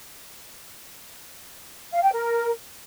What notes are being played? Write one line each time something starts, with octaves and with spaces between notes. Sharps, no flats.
F5
G5
A#4